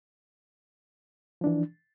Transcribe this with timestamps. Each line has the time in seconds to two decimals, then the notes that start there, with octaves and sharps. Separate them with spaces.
1.41 F3
1.44 D4
1.47 E3